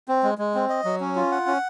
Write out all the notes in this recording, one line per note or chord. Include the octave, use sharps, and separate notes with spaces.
C4
G#3
G#3
C4
D#5
F#3
C#4
F4
F#5
C#4